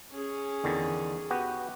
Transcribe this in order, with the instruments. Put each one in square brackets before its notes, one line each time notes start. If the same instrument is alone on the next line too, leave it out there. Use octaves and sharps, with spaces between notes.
[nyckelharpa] C#4 G#4
[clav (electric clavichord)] E2 D3 D#3
B3 F#4 G4